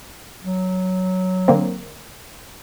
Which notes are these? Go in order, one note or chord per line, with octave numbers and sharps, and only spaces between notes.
F#3
D3 A#3 C4